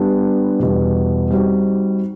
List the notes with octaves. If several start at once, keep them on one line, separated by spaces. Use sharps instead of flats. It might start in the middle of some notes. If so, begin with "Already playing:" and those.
Already playing: G3 B3 D4 G4
E2 B2 G3
G3 C4 D#4 F#4